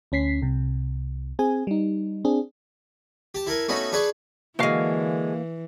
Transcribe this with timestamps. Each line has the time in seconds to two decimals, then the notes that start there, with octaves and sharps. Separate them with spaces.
0.12 D2 C#4 B6 C7
0.42 C2 C3
1.39 C4 G#4 G#5
1.67 G3 D#4
2.25 C4 D4 G#4
3.35 G4 A5
3.47 E4 A4 A#4 G#5
3.69 A3 B3 C#4 D#4 F#4
3.93 D4 G#4 B4 C#6
4.59 D3 E3 G#3 A#3 F#4 F5